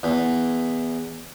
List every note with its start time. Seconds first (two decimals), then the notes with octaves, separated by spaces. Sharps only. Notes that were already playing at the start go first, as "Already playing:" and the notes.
0.03 E2